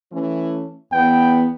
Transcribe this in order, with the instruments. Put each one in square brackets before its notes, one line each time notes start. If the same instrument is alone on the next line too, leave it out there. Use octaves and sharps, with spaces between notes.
[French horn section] E3 A3 C#4
[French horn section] E2 B3 [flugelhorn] G5